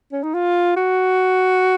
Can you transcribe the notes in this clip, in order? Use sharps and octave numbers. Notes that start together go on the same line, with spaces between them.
C#4
D#4
F4
F#4